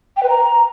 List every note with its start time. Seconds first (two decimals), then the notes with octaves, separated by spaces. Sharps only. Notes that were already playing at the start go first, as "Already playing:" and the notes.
0.17 G5
0.23 B4
0.29 A#5